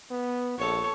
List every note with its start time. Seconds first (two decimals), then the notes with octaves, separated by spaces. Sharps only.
0.11 B3
0.58 A#1 A4 C#5